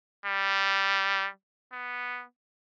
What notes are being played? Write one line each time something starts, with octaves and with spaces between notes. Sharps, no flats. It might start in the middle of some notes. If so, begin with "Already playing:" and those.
G3
B3